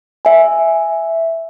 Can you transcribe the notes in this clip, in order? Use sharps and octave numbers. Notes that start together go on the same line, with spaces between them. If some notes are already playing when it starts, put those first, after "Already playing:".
E5 G#5